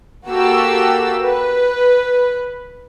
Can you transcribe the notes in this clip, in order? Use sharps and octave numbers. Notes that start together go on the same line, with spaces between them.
A#3 F#4 G4 A4 E6
B4